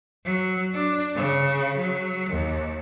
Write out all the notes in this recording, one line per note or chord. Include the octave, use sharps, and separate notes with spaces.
F#3
D4
C#3
F#3
D#2